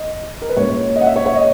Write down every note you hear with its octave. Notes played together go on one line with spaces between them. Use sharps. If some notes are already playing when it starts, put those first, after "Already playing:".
Already playing: D#5
A#4
B4
A#2 G#3 C#4 C#5
D#5
F#5
E5
C#5
C#5
D#5